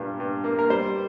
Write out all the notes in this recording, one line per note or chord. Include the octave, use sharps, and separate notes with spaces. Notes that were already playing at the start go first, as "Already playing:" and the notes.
Already playing: G2 A#2 G3
G2
A#3
A#4
G3 C5